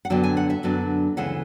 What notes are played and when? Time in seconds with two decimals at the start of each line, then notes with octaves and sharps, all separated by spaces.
0.05 F#5
0.10 F#2 D3 F#3 B3 D4 G5
0.24 G#5
0.37 F#5
0.50 E5
0.63 F#2 D3 F#3 B3 D4
1.17 D2 C#3 E3 G#3 F#5